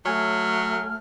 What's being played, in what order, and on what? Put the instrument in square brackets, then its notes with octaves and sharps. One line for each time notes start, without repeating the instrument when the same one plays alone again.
[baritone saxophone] F#3 [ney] A3 [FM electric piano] C#5 G#5 [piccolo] F6